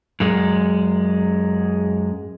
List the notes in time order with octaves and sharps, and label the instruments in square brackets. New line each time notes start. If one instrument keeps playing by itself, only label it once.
[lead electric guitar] F#2 G#3